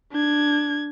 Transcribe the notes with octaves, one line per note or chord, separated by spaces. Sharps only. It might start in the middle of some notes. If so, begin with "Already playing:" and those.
D4 G#6